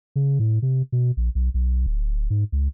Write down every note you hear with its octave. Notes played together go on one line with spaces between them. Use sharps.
C#3
A2
C3
B2
A#1
B1
B1
D1
G#2
C#2